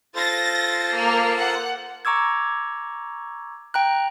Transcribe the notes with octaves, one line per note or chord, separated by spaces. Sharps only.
F4 A4 C5 A6 A#6
A#3
F#5
A#5 C#6 D6 E6 G#6
G5 A#5 F#6